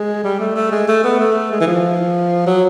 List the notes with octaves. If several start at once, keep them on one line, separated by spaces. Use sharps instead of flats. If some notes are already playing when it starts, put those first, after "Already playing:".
Already playing: G#3
G3
A3
A3
G#3
A3
B3
A3
G#3
E3
F3
F#3